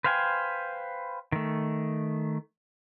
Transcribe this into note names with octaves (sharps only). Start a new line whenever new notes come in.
B4 C5 F5 G5 G#5
D#3 A3